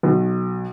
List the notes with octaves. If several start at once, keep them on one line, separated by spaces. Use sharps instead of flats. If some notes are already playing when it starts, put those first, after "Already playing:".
B1